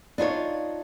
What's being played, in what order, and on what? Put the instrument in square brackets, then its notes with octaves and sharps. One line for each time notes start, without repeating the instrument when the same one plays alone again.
[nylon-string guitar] D4 D#4 F4 C#5